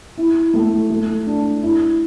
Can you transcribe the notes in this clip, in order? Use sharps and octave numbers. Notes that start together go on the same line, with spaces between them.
E4
A3
A3
D4
E4